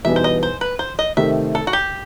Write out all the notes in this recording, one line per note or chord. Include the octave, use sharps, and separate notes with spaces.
E2 B2 G3 B3 D#4 E5
C5
D#5
C5
B4
C5
D#5
C3 D#3 A3 E5
A4
F#4
G4